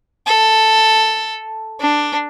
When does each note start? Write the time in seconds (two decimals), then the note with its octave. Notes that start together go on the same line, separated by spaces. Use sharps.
0.27 A4
1.80 D4